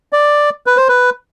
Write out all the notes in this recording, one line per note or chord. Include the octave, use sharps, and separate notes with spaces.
D5
B4
C5
B4